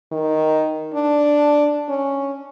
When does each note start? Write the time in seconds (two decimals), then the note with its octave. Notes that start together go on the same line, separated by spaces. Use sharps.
0.12 D#3
0.94 D4
1.89 C#4